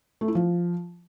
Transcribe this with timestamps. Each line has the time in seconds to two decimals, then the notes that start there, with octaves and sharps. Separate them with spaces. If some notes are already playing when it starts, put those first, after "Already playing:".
0.21 A3
0.28 E4
0.35 F3